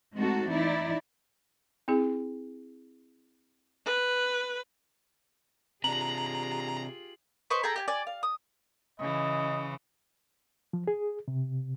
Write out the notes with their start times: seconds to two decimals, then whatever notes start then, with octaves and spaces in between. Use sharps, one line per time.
0.17 G#3 A3 C4 D#4 F#4 A4
0.51 E3 D#4 E4 D5
1.88 C4 E4 G#4
3.86 B4
5.84 C3 D4 F4 G4 G#4 A#5 F#7
7.50 B4 C5 D#5 C#6
7.63 G#4 A4 G5 A#5
7.76 G4 G5 G#5
7.88 D5 G#5
8.07 F5
8.23 D#6
9.00 C#3 E3 D#5
10.73 F3
10.88 G#4
11.28 C3